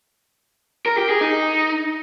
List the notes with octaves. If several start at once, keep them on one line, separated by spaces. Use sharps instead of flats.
A#4
G4
G#4
D#4